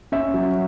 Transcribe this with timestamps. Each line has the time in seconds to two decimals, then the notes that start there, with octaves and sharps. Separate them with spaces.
0.12 C#4 E5
0.34 F#3